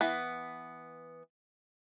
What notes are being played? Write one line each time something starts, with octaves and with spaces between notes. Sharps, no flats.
E3 B3